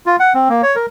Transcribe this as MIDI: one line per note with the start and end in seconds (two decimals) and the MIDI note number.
0.06 0.16 65
0.20 0.33 78
0.34 0.49 60
0.49 0.62 58
0.63 0.76 73
0.76 0.86 70